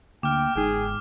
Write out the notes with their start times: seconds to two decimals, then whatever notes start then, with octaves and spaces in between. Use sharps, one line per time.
0.23 D2 A#3 G5 D6 F6
0.56 G1 G#2 G#4 G5